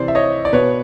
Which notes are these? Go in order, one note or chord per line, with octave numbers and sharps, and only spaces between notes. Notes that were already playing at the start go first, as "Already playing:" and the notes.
Already playing: C3 E3 C5 D5
E5
C#5 D#5
D5
B2 B4 C#5